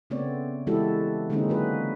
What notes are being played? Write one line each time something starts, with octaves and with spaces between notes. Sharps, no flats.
C#3 A3 B3 C4 C#5 D5
E3 G#3 E4 F#4 G4 A4
D3 G#3 A#3 C4 C#4 D#4
F#3 F#4 B4